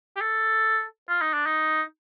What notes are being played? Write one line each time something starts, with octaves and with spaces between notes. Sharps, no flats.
G4
A4
F4
D#4
D4
D#4